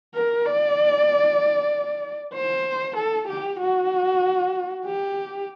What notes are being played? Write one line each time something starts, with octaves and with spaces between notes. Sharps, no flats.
A#4
D5
C5
A4
G4
F#4
G4